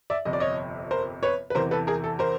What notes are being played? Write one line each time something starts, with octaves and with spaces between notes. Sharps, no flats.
D5 E5
G1 F2 C3 D#5
D5
C#5 D#5
A#4 C5
B4 C#5
B4
E2 C3 E3 A#4 C5
A4 B4
G#4 A#4
A4
A#4 C5